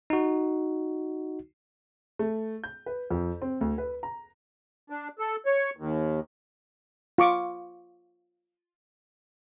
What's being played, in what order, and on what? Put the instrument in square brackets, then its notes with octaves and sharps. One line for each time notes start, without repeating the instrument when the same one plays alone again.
[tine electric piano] D#4 F#4
[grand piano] A3
G6
B4
F2
C4
D2
B4
A#5
[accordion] D4
A4
C#5
D#2
[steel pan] F4 C#6 D6